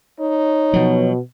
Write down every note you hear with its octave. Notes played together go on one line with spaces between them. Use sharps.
D#4 C#5
B2 F3 F#3